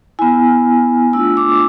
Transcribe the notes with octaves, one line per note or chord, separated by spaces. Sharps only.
B3 E4 G#5
A3 D4 F4 E6
D6